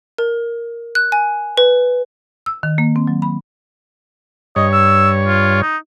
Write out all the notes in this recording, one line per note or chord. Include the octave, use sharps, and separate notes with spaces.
A#4
F#6
G#5
B4
E6
D#3
A#3
C4
F#3
B5
G2 C#5 D#5
E6
F4
D#4